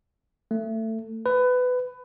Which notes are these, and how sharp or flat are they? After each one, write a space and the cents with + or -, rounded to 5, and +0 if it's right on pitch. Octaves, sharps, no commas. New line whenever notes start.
A3 +20
B4 +20